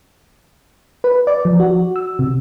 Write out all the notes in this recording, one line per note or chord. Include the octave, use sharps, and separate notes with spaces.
B4
D5
F3
F#4
E6
C3